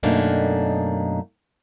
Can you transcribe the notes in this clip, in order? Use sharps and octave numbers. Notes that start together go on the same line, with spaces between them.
F#2 B2 A3 A#3 D4 D#4